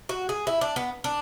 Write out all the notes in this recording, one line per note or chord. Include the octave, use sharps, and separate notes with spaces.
F#4
G#4
E4
D4
B3
D4